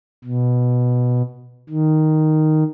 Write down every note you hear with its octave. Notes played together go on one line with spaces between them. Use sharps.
B2
D#3